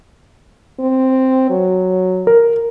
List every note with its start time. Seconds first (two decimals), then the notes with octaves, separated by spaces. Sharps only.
0.79 C4
1.50 F#3
2.27 A#4